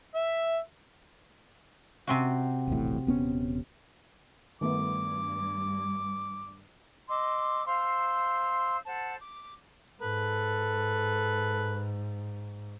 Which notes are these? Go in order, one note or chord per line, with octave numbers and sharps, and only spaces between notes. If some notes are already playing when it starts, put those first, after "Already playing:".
E5
C3 C4 F#4
D#1 A1 A2
D#1 B3 C#4
G2 D#3 A3 B3 D6
D#5 C6 D6 E6
C5 F5 C6 E6
A4 C5 F#5 A5
D6
G#2 A4 B4